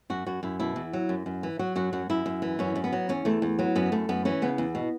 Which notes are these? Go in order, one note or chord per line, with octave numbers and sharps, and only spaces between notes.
F#2 F#4
F#2 F#4
F#2 E4
B2 E4
E2
F#3
F#2
F#2
E3
F#3 F#4
F#2 F#4
F#2 F#4
F#2 E4
F#2
E3
F#2 C#4
F#2
B3
F#3
E2 C#4
E2 A3
E2
F#3 B3
F#2 B3
F#2 A3
F#2 B3
E3 C#4
C#3 B3
E2
B2